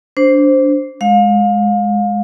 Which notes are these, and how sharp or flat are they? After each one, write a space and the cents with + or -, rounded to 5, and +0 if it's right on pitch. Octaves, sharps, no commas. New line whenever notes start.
D4 -20 C5 +0
G#3 +0 F5 +30